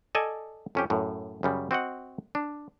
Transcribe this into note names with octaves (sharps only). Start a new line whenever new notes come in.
A4 D5 D#5 G#5
F2 C#4 G4
F#2 A2
F#2 C#3 G3
C4 F#4 D#5 F#5
D4